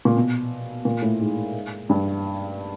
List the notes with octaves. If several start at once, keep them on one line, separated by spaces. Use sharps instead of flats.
A#2
B2
A#2
A2
G#2
G2